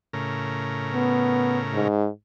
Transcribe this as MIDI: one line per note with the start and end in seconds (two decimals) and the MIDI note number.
0.13 1.88 45
0.13 1.88 49
0.13 1.88 70
0.94 1.60 59
1.74 2.08 44